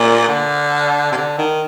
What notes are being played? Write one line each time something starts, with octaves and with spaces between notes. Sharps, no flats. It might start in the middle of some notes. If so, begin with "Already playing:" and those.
Already playing: A#2
D3
C3
D3
D#3